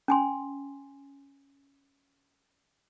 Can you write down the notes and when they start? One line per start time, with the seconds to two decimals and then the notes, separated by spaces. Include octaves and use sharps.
0.08 C#4 G#5 C6